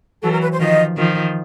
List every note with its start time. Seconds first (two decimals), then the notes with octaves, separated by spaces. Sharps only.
0.23 E3 F#3 A4
0.32 A#4
0.42 B4
0.52 C5
0.60 D#3 F3 D#5
0.97 D#3 F3